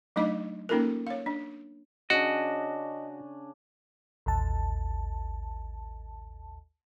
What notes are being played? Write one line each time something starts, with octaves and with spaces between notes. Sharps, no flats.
F#3 A3 D4 D#4 D#5 D6
A#3 C#4 D#4 F4 A4 A#4
C#5 F5
D4
C#3 C#4 D4 F#4 D#5
A1 D#2 A5